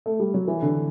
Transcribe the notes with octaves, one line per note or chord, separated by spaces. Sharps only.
A3
G3
F#3
E3
D3